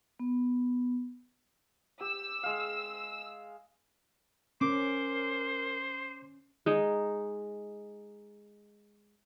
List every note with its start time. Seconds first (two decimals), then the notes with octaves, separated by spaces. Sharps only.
0.19 B3
2.01 G4 E6
2.43 G#3 F5
4.61 C#4 A#4 C5 D6
6.66 G#3 D#4